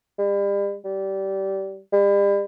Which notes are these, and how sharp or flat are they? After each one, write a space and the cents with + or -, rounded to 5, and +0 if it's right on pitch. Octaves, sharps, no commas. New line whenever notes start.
G3 +40
G3 -20
G3 +40